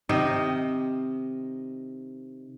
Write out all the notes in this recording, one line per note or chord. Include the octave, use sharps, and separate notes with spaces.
C3 D#3 D#5